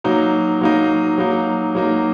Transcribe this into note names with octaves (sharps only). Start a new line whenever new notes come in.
F#3 A#3 D#4
F#3 A#3 D#4
F#3 A#3 D#4
F#3 A#3 D#4